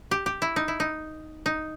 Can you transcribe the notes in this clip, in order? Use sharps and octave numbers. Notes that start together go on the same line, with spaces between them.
G4
G4
E4
D#4
E4
D#4
D#4